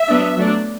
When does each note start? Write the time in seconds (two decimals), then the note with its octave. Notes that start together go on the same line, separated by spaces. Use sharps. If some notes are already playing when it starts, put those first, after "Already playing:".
Already playing: E5
0.09 F#3 B3 D4
0.37 F#3 A3 D4